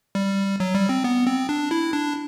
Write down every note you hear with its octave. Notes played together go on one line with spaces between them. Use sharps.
G3
F#3
G3
C4
B3
C4
D4
E4
D4